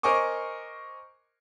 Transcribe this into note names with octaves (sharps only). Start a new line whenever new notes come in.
A#4 C5 D#5 G#5 C#6 D6